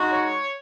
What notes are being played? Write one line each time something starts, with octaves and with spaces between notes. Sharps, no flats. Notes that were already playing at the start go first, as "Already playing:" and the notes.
Already playing: G#3 D#4 F#4
C#5